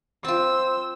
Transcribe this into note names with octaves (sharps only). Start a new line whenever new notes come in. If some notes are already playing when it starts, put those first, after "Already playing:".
C4 F4 C5 E6